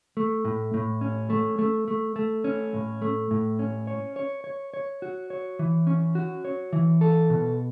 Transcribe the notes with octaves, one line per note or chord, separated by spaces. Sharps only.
A3
A2
A2
C#4
A3
A3
A3
A3
C#4
A2
A3
A2
C#4
C#5
C#5
C#5
C#5
F#4
C#5
E3
C#4
F#4
C#5
E3
A4
B2